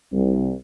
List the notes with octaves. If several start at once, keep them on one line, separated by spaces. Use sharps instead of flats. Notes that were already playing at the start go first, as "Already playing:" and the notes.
C2